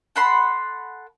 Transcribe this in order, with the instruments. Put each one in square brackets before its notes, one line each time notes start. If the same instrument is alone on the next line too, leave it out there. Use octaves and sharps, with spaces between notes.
[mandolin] A4 F#5 B5 C6